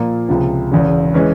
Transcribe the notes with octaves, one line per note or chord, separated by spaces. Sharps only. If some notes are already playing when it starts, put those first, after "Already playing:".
Already playing: A#2 F3 A#3
C#2 C3 F3
E1 E2 C#3
E3 G#3 C#4